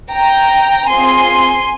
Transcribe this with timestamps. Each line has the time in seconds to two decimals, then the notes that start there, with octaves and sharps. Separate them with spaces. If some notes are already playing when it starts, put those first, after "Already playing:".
0.11 G5 A#5
0.89 C4 F4 G#4 G#5 C6